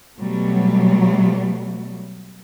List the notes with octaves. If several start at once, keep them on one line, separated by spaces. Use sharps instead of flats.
B2 F#3 G3 A3